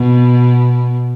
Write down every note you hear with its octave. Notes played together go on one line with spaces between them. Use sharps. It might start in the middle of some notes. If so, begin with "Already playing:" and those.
Already playing: B2